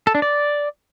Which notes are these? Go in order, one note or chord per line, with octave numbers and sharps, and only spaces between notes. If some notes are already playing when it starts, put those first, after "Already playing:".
A4
D4
D5